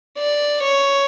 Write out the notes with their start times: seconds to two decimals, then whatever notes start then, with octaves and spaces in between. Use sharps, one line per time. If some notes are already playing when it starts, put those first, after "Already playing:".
0.19 D5
0.64 C#5